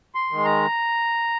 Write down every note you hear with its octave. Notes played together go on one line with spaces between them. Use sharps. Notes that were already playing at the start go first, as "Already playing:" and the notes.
C6
D#3 G#3
A#5